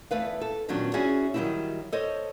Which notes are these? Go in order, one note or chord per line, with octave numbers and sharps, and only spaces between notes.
E2 A3 B4 F5
A4
A#2 D#3 F#3 B3 C#4 D4
C#4 E4 F#4 G#4 C#5 D5
D#3 F#3 G3 A3 D#4 E4
A4 C5 C#5 D#5